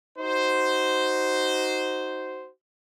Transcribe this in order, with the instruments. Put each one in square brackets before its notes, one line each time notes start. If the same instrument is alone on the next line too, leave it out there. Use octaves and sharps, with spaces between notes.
[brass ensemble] D#4 F#4 C5